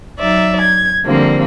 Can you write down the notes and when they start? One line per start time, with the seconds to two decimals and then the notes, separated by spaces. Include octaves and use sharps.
0.19 F#3 D#4 D5 E5
0.61 G#6
1.05 D3 F3 G3 A#3 C4